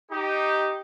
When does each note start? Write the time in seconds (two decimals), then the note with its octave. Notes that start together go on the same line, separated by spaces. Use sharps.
0.11 D#4 G4